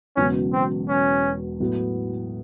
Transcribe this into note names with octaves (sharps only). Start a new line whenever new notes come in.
E1 E2 C#3 F#3 C#4
C4
C#4
A2 F#3 B3 E4